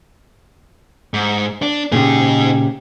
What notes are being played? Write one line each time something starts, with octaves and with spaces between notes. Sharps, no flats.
G#2
D4
A#2 C#3 D#4 G4 G#4